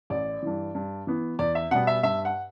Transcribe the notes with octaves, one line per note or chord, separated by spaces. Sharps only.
A1 D5
G2 E3
G2
E3 B3
E2 D5
E5
B2 G3 B3 F#5
E5
G2 E5
F#5